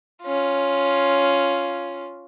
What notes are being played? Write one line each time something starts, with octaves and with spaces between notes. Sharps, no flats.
C#4 F4